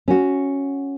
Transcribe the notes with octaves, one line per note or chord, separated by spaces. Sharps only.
C#4 F#4